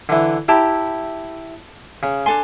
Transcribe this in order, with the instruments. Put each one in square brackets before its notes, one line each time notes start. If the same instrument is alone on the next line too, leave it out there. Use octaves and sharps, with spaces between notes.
[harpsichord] D3 E3
[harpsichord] E4 G4 [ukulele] G5 A5 A#5
[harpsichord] C#3
[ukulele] D4 A4 G#5 [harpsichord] C6